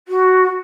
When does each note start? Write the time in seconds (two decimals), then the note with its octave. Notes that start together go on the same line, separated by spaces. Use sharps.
0.08 F#4